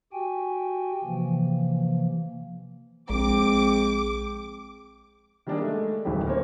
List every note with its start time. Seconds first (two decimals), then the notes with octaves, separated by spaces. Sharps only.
0.13 F#4 G4 G5 G#5
1.04 C3 E3 F3 A#3
3.10 A#1 G#3 C4 D6
5.47 D#3 G3 A#3 D4 G4 G#4
5.61 G#3 A3
6.05 D1 F#2 D#3 F#3 G4 B5
6.27 A#3 C4 C#4 C5 C#5